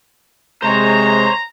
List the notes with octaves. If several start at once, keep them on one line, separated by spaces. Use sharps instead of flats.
C3 G#3 C5 C#5 A#5